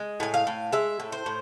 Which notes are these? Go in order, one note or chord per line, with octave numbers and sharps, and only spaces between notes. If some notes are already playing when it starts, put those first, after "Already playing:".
Already playing: G#3
A2 G#5
F5
A2
G#3 E5
A2
C5
A2